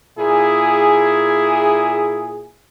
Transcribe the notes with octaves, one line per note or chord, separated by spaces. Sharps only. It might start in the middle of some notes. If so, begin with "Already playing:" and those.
A#2 E4 G#4